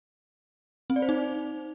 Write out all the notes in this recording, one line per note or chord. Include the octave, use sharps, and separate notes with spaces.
C4
D5
C5
D#4